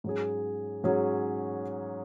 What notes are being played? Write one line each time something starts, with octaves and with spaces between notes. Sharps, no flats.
G#2 F#3 C#4 G#4
G#2 F#3 C#4 G#4